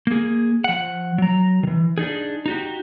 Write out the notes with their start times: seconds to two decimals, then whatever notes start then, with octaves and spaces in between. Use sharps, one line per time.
0.07 A#3 G#4
0.64 F3 F#5
1.18 F#3 A#5
1.63 D#3 E3
1.98 D4 D#4 G#4
2.46 D#4 F#4 G4